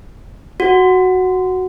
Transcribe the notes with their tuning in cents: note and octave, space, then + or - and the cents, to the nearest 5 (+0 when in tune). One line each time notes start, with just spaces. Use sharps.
F#4 +0